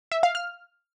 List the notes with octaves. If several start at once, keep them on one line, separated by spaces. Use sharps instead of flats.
E5
F5
F6